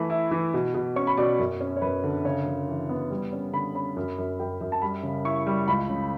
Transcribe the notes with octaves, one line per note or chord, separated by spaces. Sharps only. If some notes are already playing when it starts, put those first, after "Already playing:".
Already playing: E3 A3 B5
E4
E3
B2
B2
C#4 C#6
B5
B2 D5
F#2
C#4
C#5
F#2 B4
D3
C#3 C#5
C#3
E3
B3
G3
C#4
D3 B5
C#4 B5
F#2
F#2
F#2 G5
F#2
A5
G3 B5
C#3
E4 C#6
G3
C#2 B5
C#3